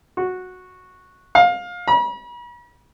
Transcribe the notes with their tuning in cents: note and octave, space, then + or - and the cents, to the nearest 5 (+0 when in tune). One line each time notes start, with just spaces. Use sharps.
F#4 -10
F5 +25
B5 -45